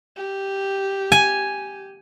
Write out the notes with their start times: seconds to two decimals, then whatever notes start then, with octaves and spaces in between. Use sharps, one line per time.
0.17 G4
1.12 G#5